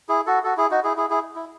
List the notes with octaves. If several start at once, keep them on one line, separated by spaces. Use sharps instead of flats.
E4 G#4
F#4 A4
F#4 A4
E4 G#4
D#4 F#4
E4 G#4
E4 G#4
E4 G#4
E4